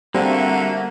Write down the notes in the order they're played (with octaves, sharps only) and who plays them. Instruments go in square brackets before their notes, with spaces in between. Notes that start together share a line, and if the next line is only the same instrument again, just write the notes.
[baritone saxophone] D3 [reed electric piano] G3 C4 [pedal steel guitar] A#3 [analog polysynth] F#4 E5